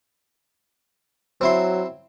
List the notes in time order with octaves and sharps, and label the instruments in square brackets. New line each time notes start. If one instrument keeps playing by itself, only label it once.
[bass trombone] F#3 [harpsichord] C4 E4 C6